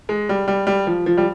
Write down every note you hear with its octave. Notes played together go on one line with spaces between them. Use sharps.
G#3
G3
G3
G3
F3
F3
G3